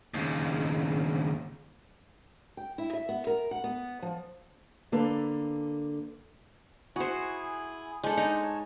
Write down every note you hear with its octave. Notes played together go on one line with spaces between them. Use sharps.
D#2 C#3
G5
E4
E5
B3
A#4
F#5
B3
F3
D3 A#3 A4 B4
E4 F#4 G#4 C5 G#5
G#3 D4 A4 C5
D#4
C#5 A5